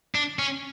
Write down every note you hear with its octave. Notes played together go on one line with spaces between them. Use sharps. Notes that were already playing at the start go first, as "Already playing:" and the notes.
D4
C#4